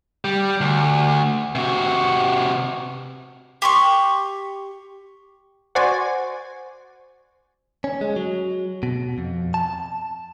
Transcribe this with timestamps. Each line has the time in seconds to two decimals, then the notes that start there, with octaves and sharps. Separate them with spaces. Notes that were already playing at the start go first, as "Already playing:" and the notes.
0.25 G3
0.61 D2
1.55 C3 F#4
3.62 G4 C6 C#6
5.75 F#4 C5 D5 G#5
7.84 C#4
8.01 G#3
8.16 F#3
8.83 B2
9.18 F2
9.54 A5